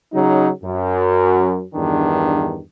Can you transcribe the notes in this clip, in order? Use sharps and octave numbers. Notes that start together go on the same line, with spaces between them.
C#3 F#3 D#4
F#2
E2 G2 D#3 D4